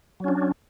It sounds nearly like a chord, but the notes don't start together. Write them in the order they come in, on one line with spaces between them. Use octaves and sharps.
F#3 C#4 D4